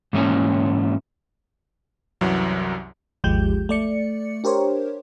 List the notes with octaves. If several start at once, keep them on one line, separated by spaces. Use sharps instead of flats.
G#2 E3 A3 A#3 C#4
C2 F#2 E3 F#3
G#1 D#2 F3 G#3 G4 G6
A3 D5 C#7
D4 G4 A#4 C5 C#5